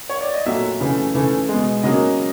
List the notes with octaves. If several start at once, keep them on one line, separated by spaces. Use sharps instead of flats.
C#5
D5
D#5
A#2 F#3 A3 E5
C#3 E3 A3
C#3 E3 A3
B2 G#3
C#3 F#3 A#3 D#5